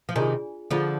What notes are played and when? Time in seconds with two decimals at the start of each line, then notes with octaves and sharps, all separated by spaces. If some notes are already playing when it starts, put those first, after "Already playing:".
0.09 F3
0.16 C3 D#3 D4 F4 G#4 D5 G#5
0.71 D3 F3 F4 G#4 D5